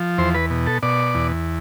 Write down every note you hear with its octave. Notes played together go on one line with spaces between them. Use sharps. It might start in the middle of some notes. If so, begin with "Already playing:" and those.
Already playing: F3
E2 C5
B4
B2
A4
B2 D5
E2